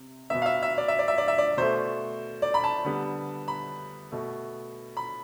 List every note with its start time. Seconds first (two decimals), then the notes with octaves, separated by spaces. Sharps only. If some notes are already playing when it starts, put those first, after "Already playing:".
Already playing: C3
0.30 B2 B3 E5
0.42 F5
0.46 E5
0.63 E5
0.78 D5
0.88 E5
0.99 D5
1.08 E5
1.18 D5
1.28 E5
1.38 D5
1.57 B2 A3 C5
2.42 D5
2.54 B5
2.64 A5
2.85 D3 G3 B3
3.48 B5
4.12 B2 A3
4.97 B5